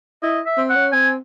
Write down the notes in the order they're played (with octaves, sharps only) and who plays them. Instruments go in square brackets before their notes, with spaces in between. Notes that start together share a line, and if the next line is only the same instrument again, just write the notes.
[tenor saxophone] E4 [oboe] D#5
[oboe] E5
[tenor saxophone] C4
[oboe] F#5
[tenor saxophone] C#4
[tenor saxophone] C4 [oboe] G#5